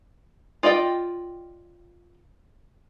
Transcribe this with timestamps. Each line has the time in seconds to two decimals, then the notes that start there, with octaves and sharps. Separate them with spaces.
0.63 F4 D5 D#5 G5